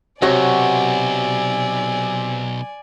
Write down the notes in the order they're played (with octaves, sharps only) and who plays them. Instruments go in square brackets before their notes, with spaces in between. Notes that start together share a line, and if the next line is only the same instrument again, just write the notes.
[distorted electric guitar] B1 [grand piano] C3 [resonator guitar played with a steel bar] F#4 C#5 [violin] D5 G#5